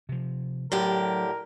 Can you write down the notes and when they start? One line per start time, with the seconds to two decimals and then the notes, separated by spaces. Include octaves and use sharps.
0.09 C3 F3
0.72 A2 D3 F#3 G4 A#4